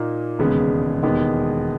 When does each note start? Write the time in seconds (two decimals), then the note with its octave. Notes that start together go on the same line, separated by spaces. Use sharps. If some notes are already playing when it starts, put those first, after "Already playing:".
Already playing: A#2 A#3 D#4
0.39 E1 D#2 C#3 G#3 B3
1.03 E1 D#2 D#3 G#3 B3